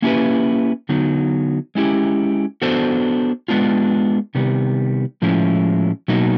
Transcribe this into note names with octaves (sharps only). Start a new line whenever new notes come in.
A#3 C#4 E4 G4 B4
D3 F#3 B3 D#4
G#3 C#4 E4 G4
B3 D4 F#4 A4 C5
G#3 B3 D4 F4
C3 D#3 G3 B3
A2 F3 G#3 C#4 E4
B2 F#3 A#3 D#4